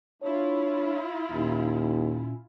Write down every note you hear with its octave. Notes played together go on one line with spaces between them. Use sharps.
D4 E4 F4 C#5
D#2 A#2 C#4